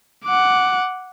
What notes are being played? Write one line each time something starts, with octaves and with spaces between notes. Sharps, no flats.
F#5 D6